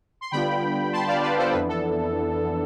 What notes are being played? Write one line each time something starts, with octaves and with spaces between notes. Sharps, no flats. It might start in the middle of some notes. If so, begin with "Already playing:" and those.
C6
D3 G3 B3 D4 F4 G5 B5
A5 C6
D5 F5
B4 D5
A4 C5
F2 E3 B3 D4 B4
A4